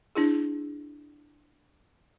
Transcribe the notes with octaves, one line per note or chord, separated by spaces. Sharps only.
D4 E4 G#4